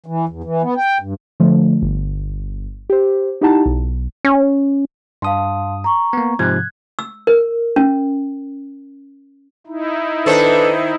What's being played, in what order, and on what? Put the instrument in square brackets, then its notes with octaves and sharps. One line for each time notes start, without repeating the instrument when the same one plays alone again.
[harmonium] E3
E2
E3
B3
G5
G2
[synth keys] D3 F3 A3
G1
G4 C5
D#4 E4 G4 F#5 A5 A#5
B1
[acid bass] C#4
[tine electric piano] G2 D#6 [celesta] F5 A5 C6
[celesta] A#5 C#6
[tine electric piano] A#3 B3
[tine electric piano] G#2 C3 F3 [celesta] F#6 G#6
[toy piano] E6
A#4
C#4
[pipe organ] D#4 E4
[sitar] D#3 C5 [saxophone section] D4 A4 [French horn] B4